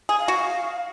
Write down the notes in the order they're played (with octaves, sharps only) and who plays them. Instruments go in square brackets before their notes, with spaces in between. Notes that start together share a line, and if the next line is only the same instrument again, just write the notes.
[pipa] G#4
[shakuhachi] F5
[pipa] F#4